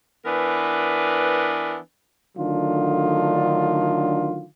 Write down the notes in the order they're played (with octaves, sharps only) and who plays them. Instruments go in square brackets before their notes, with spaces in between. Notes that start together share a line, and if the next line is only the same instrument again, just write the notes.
[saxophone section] E3 B3 D4 A#4 B4
[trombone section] D3 D#3 F#3 A3 D4 F4